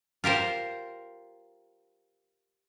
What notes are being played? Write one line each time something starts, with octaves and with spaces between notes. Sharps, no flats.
F4 G4 A#4 C5